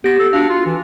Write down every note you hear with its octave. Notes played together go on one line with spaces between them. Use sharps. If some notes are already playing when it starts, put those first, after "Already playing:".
B3 G4 A#6
A4
D4 F#4 F5
F4
E3